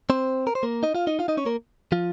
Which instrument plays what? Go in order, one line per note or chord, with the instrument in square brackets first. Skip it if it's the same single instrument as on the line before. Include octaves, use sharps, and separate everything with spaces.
[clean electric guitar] C4 C5
A#4
C5
A#3 A#4
D#4 D#5
F4 F5
D#4 D#5
F4 F5
D#4 D#5
C#4 C#5
A#3 A#4
F3 F4